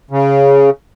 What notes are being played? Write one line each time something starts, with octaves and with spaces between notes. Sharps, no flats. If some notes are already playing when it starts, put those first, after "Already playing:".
C#3